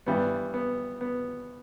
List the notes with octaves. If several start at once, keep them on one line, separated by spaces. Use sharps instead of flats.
G2 E3 G3 B3
B3
B3